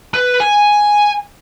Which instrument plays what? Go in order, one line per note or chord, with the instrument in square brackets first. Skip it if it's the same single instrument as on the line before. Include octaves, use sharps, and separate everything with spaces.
[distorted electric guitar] B4
G#5